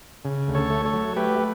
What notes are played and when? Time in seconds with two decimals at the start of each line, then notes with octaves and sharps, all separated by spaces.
0.25 C#3
0.48 D2
0.55 A4 C#5
0.70 A3
0.86 A4 C#5
0.93 F#3
1.16 A3 G4 B4
1.39 A3